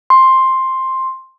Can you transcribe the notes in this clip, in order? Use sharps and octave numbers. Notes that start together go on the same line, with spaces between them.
C6